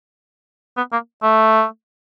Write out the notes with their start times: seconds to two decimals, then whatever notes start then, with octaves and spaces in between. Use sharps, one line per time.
0.77 B3
0.92 A#3
1.23 A3